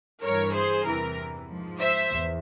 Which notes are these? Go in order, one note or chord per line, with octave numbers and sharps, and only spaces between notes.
G2 E3 A#4 C#5
G#4 C5
E2 C3 E3 A#4
G#2 F3
C5 E5
E2